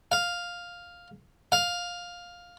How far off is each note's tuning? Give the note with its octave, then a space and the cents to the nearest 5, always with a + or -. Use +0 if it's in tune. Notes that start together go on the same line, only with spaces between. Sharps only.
F5 +5
F5 +10